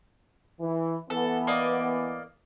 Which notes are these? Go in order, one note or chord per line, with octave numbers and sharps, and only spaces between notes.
E3
E3 B3 A4
A#3 D5 D#5